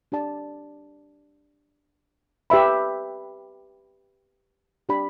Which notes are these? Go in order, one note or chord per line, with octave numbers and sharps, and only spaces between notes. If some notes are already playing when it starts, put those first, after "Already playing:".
D4 G4 D5 A5
G4 B4 E5 B5
D4 G4 D5 B5